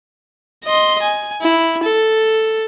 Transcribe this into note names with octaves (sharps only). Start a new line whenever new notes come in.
D#5 C6
G#5
E4
A4